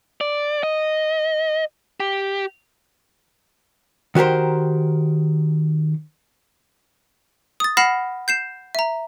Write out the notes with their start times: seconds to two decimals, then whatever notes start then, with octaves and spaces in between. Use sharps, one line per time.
0.21 D5
0.63 D#5
2.00 G4
4.15 D#3 F#4 G4 A#4 C5
7.60 D#6 A6
7.77 F#5 B5 F6 A#6 C7 E7
8.28 G6 C7 E7
8.75 E5 A#5